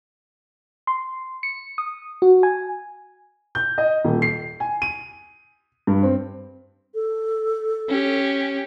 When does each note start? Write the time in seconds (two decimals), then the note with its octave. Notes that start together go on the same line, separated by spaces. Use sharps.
0.87 C6
1.43 C#7
1.78 D#6
2.22 F#4
2.43 G#5
3.55 G6
3.78 D#5
4.05 D#1
4.22 C7
4.60 G#5
4.82 D#7
5.87 G2
6.03 C4
6.95 A4
7.89 C#4 G4